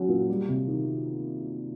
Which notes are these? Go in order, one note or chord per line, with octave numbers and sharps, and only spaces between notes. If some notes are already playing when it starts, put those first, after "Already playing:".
Already playing: F#3 C#4
A#2
G3
C3
D#3